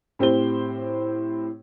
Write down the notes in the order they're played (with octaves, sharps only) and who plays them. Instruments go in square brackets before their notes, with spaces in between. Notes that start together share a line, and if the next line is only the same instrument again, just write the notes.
[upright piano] A2 C4 G4 C5 G7